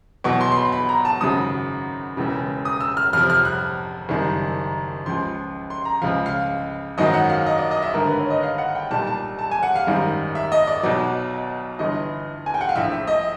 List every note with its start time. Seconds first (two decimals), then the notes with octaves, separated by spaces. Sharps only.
0.24 E2 B2 F#3 C#6
0.41 C6
0.52 C6
0.56 B5
0.72 B5
0.89 A#5
1.05 A5
1.20 G#1 F#2 C#3 F#3 D#6
2.17 E1 E2 C#3
2.65 D#6
2.81 E6
2.97 F6
3.13 F2 C3 F3 F6
3.30 F6
3.45 F#6
4.09 F#1 F#2 D#3 G3
5.06 C#2 C#3 F3 C6
5.70 C6
5.85 A#5
6.02 C#2 C#3 F3 F5
6.26 F5
6.98 G#1 F#2 D#3 F#3 D#5
7.14 F#5
7.30 F5
7.46 D#5
7.58 D5
7.71 D#5
7.82 E5
7.94 G#1 G2 D3 A#4
8.06 B4
8.18 C#5
8.30 D#5
8.43 F5
8.58 F#5
8.75 G5
8.91 B1 A#2 G3 A5
9.07 A5
9.39 A5
9.51 G#5
9.63 F#5
9.76 F5
9.87 G#1 F#2 D#3 G3
10.35 E5
10.52 D#5
10.67 D5
10.83 B1 B2 F#3 D5
11.79 G1 G2 E3 D#5
12.46 G#5
12.54 G5
12.61 F#5
12.69 F5
12.76 A#1 A2 F3 E5
12.92 E5
13.07 D#5